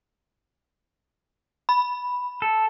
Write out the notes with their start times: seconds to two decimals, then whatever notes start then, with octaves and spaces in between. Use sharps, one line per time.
1.69 B5
2.42 A4